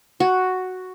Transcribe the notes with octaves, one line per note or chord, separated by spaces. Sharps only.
F#4